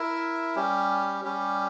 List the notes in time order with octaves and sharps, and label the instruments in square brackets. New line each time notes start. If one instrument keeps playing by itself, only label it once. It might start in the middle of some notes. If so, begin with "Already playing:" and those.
Already playing: [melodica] E4 A#4 E5
G3 C#4 G4
G3 C#4 G4